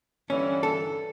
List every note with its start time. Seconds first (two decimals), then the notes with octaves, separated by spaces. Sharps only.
0.30 G2 D3 E3 C#4
0.63 A4